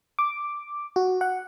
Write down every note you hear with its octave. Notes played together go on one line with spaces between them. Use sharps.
D6
F#4
F#5